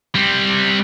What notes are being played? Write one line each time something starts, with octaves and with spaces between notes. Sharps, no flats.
G3 C4